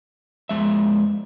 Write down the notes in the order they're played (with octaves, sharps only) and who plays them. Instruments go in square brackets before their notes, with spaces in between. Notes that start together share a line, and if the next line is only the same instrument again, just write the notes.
[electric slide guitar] F2 G#3 E5